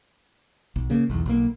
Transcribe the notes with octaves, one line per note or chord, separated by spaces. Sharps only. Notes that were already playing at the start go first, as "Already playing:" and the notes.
B1
C#3 A#3
B1 E2
B1 G3 A#3